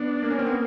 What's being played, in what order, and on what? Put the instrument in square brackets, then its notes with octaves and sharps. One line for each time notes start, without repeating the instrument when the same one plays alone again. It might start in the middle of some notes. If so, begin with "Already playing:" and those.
Already playing: [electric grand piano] B3 [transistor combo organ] D4
[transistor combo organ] A#3
[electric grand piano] C#4
C4
B3